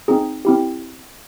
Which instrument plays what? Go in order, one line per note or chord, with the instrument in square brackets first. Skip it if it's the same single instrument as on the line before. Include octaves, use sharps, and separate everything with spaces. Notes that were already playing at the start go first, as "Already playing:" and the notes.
[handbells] C4 D#4 G#4
C4 E4 G4